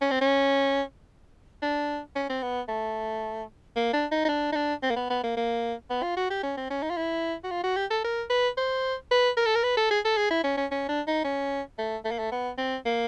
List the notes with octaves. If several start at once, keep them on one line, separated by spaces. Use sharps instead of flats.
C#4
C4
C#4
D4
C#4
C4
B3
A3
A#3
D4
D#4
D#4
D4
D#4
D4
C4
A#3
B3
B3
A#3
A#3
B3
F4
F#4
G4
C#4
C4
C#4
D#4
F4
E4
F#4
F4
F#4
G4
A4
A#4
B4
C5
B4
A#4
A4
A#4
B4
A4
G#4
A4
G#4
E4
C#4
C#4
C#4
D4
D#4
C#4
A3
A3
A#3
A3
B3
C4
A#3